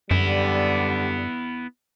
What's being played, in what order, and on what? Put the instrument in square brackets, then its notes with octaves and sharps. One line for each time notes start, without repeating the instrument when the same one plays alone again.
[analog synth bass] F#2 [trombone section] D3 G3 [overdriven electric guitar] B3 E4